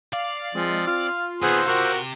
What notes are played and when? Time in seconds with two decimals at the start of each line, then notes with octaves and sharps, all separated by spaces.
0.13 D5 F5
0.55 F3 G#3 C4
0.87 F4 F5
1.42 A#2 D#3 B3 G#4 C5 F#5 E6
1.67 C3 F#4 G4 A#4